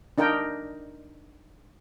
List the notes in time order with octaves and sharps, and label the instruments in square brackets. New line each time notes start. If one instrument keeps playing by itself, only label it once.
[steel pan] D4 D#4 A#4 G5